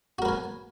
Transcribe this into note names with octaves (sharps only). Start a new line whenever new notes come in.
F#4 A#4 B4 G#5